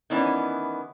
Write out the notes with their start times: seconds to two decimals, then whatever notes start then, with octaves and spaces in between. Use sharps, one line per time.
0.10 D#3 E3 G3 B3 C#4 E4